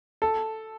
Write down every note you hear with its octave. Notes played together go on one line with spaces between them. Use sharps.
A4